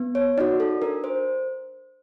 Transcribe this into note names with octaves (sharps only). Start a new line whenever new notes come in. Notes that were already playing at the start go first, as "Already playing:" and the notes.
Already playing: B3
C#5
D#4 F#4 D5
A4
D4 A#4
C5